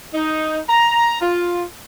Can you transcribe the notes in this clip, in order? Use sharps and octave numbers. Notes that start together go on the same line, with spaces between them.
D#4
A#5
F4